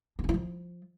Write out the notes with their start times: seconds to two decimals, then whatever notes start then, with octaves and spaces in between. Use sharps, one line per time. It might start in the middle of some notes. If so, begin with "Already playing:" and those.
0.19 D4
0.24 C#4
0.29 E4
0.34 F3